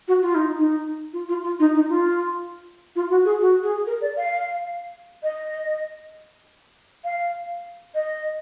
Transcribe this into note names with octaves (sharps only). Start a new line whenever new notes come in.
F#4
F4
D#4
D#4
F4
F4
F4
D#4
D#4
F4
F4
F#4
G#4
F#4
G#4
A#4
D5
F5
D#5
F5
D#5